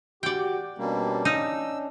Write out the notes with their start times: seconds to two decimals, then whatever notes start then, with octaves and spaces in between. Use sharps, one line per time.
0.23 F#4 G4 D5 G5
0.78 B2 G3 A#3 C#4 D4
1.25 D#4 E6